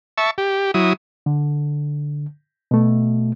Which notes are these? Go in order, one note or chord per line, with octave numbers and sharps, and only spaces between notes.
E5 A5 C#6
G4
F#3 E4 D#6
D3
B2 A3